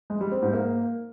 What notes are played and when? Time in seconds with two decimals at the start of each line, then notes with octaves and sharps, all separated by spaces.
0.10 G#3
0.21 G3
0.32 C4
0.42 G#2
0.53 A#3